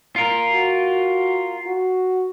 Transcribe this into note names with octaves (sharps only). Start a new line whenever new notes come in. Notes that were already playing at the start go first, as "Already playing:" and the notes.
F4 A#4
F#4
F#4